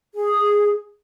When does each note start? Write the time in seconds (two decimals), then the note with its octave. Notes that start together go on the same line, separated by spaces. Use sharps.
0.14 G#4